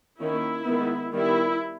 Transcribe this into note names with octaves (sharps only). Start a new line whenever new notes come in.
D#3 A#3 C#4 E4
D#3 G#3 B3
D#3 G3 B3 E4